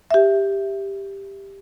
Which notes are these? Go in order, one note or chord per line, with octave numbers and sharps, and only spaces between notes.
G4 E5